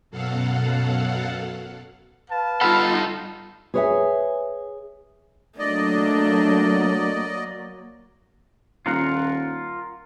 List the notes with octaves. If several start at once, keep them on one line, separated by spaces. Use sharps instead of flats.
F#2 B2 F#3 A4 F5 F#5
B4 F5 A5
G2 D#4 F4 A4 F#5 B5 F6
G#4 B4 C#5 D5 E5 G#5
F#3 A3 A#3 D4 D5 D#5
D#1 F4 A#4 F#5